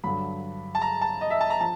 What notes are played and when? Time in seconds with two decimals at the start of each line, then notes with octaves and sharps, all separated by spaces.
0.04 G2 D3 F#3 B5
0.75 A5
0.82 A#5
1.01 A5
1.21 D#5
1.30 E5
1.41 A5
1.50 A#5
1.60 F3 A5